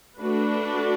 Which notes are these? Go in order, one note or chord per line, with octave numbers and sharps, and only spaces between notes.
A3 D4 F#4 B4